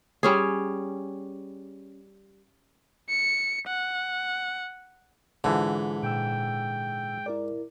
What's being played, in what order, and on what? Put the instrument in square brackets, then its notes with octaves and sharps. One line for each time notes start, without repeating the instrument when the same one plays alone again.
[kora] G3 C#4 G#4
[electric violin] C#7
F#5
[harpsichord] G#2 [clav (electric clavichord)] D3 E3 [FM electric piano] F4 A5
[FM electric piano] A#2 E6 [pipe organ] G5
[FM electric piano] E4 A#4 D5